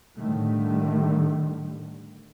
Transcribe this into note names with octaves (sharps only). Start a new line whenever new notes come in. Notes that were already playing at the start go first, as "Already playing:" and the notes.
A2 D3 D#3 G3 A3